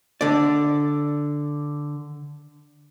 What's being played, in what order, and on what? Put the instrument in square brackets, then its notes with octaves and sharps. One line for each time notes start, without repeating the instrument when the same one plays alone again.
[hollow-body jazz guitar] D3 D5